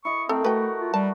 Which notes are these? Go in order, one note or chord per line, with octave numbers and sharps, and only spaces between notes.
E4 D#5 C#6
A3 C4 A4 A#4 F#5
A3 F#4 B4 G5
F4
G3 A5